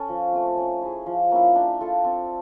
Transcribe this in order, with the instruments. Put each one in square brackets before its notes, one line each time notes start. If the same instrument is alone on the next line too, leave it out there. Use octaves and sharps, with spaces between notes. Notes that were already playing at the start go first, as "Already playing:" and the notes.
Already playing: [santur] C#4 A4
F3
A3 C4
C#4
E4 G#4
F3
A#3 C#4 E4
D4
F4 A4
C4